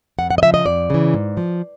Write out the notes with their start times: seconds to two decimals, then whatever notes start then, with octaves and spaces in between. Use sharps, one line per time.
0.19 F2 F#5
0.31 F#5
0.38 D#5
0.42 C#3 F3 E5
0.54 D#5
0.66 F2 D5
0.90 C#3 E3
1.14 G#2
1.37 F3